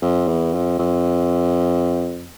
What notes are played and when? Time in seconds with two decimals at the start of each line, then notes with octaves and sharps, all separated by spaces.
0.02 F2
0.28 E2
0.53 F2
0.78 F2